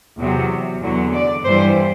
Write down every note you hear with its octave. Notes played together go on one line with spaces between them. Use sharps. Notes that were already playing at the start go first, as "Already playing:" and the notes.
E2 C3 F#3
E2 D3 F#3
D5
G2 E3 G3 C5